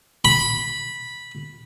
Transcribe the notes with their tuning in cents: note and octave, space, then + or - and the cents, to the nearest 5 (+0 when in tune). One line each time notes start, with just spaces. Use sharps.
B5 -10